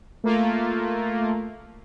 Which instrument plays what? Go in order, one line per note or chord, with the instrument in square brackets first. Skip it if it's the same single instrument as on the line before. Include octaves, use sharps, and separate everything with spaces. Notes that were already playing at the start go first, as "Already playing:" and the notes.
[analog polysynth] A3 A#3 F4